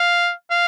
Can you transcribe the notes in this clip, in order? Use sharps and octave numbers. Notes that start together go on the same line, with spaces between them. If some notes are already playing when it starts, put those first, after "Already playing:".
Already playing: F5
F5